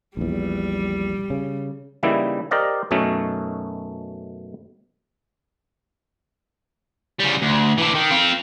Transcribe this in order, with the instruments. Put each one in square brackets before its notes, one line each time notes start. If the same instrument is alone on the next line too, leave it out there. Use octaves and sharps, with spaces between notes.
[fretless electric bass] A#1 E2 [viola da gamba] G3
[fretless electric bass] C#3
[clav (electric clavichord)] C#3 E3 G3 A#3 D#4 E4
G4 A#4 C5 D5 D#5 F5
F#2 B2 A3 C#4 D#4
[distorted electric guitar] C#3 G3
D2
E3 D4
D#3
C4 F4